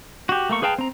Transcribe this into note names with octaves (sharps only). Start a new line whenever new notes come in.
F#4 G4
A3 A#3 C#6
G#4 B4 F5 G5 A5
C4 A#5